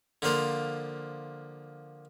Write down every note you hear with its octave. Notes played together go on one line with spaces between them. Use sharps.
D3 F3 A#3 C5